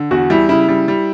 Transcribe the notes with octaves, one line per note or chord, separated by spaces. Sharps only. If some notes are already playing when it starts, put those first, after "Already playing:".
Already playing: D3
E2 F#4
G3 E4
C#3 E4
G3
G3